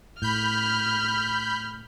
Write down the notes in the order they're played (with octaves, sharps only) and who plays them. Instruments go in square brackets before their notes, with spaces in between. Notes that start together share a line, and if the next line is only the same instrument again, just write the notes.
[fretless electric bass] A2 [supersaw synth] B5 G6 [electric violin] F6